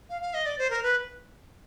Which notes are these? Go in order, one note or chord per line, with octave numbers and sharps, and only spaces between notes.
F5
F5
D#5
D5
C5
A#4
B4